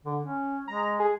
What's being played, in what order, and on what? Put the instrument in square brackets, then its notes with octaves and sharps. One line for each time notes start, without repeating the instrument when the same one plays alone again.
[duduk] D3
C#4
[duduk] G#3 [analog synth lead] A#5
[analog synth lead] G#4